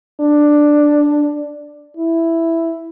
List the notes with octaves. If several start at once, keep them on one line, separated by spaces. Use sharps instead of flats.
D4
E4